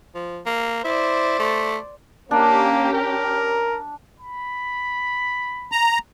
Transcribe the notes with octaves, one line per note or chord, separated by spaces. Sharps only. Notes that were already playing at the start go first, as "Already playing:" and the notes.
F3
A#3
E4 C5 D5
A3
A#3 C#4 D4 G4
A#4
B5
A#5